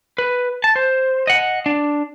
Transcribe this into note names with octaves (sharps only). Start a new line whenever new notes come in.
B4
A5
C5
D#5 F#5
D4